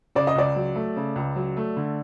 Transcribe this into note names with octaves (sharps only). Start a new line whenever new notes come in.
C#3 D5
D#5
C#2 D5
F#3
A3
C#3
C#2
F#3
A3
D3